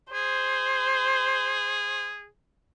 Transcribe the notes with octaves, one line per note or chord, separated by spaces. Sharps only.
G#4 C5